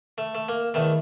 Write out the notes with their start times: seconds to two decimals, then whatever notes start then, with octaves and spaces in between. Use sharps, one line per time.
0.18 A3
0.35 A3
0.49 A#3
0.74 E2 D#3 A3